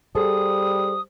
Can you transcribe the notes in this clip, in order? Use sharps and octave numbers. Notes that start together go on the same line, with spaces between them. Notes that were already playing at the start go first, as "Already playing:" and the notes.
G3 G#4 A4 C5 D#6